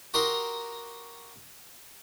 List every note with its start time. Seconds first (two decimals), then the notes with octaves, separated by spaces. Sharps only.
0.14 F#4 G4 A#4 D#5 A#5 C6